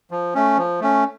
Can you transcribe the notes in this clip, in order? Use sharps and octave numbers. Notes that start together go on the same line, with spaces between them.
F3
A3 C#4
F3
A3 C#4